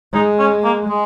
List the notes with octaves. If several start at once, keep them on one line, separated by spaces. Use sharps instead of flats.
G#3 D#4
C#4
A#3
G#3